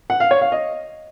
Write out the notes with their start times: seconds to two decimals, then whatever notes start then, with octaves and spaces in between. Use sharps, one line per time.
0.10 F#5
0.20 F5
0.31 C#5
0.41 F5
0.52 D#5